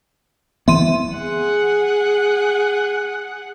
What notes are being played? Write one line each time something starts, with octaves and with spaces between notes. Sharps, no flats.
E3 B3 E5 C6 D#7
G#4 F#5